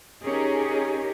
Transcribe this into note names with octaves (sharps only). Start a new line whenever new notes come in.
C#4 D#4 G4 G#4 A#4